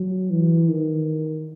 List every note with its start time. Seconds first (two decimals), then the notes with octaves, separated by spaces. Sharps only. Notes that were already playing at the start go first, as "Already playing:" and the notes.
Already playing: F#3
0.31 E3
0.69 D#3